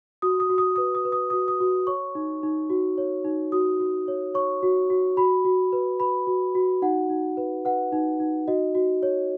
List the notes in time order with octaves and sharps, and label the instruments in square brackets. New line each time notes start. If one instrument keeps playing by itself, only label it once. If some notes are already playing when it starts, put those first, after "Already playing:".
[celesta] F#4 D#6
D#6
F#4
D#6
B4 D#6
D#6
B4
D#6
F#4 D#6
D#6
F#4
C#5 C#6
D#4
D#4
F#4
C#5
D#4
F#4 D#6
F#4
C#5
C#5 C#6
F#4
F#4
F#4 B5
F#4
B4
B4 B5
F#4
F#4
D#4 F#5
D#4
B4
B4 F#5
D#4
D#4
F#4 D#5
F#4
C#5